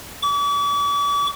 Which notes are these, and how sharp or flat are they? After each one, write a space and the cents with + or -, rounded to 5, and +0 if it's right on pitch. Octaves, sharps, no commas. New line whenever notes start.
D6 -45